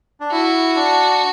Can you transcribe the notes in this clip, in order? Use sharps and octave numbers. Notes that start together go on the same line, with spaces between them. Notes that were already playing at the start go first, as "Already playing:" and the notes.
D4
E4 F#4
D4